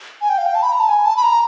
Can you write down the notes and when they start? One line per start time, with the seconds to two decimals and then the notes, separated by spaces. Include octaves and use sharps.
0.21 G#5
0.29 G5
0.38 F5
0.46 G5
0.55 A5
0.62 B5
0.72 A#5
0.80 A5
0.88 G#5
1.05 A5
1.17 B5
1.23 A#5